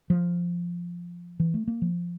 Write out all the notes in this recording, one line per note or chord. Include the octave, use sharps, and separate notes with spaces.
F3
E3
A3
A#3
F3